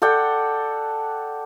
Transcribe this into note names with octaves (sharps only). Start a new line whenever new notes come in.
A4 D5 F#5 G5